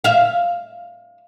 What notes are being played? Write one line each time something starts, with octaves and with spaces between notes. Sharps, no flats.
E5 F5